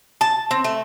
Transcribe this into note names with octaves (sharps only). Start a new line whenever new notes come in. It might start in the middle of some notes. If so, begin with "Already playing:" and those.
A5
C4
A3